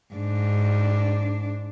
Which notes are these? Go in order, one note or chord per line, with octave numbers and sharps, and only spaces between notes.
G#2 D4